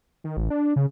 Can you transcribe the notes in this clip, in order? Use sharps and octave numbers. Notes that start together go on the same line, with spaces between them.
D#3
A1
D4
C#3